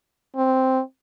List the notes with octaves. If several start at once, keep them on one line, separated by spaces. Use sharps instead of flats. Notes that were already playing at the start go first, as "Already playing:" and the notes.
C4